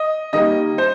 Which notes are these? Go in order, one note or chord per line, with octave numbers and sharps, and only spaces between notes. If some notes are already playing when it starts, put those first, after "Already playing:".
Already playing: D#5
D#3 G3 A#3 D#5
C5